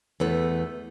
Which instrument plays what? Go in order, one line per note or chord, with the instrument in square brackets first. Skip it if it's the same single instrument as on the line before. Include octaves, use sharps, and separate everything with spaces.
[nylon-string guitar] E2 A3 B4